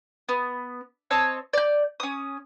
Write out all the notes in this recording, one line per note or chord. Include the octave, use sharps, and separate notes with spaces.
B3
C4 C#5 D#5 A5
D5 G6
C#4 D#6